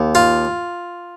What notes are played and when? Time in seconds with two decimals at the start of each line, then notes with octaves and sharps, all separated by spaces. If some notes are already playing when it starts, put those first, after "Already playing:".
Already playing: D#2
0.15 F4